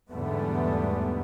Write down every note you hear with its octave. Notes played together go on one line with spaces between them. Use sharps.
E2 G#2 D3 G3 A3 B3